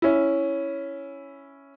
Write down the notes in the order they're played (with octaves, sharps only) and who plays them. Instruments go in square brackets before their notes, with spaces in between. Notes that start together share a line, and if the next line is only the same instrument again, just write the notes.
[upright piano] C#4 E4